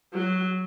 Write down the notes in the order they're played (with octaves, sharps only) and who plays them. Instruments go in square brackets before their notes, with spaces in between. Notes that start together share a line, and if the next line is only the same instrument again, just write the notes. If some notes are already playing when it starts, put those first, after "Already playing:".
[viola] F#3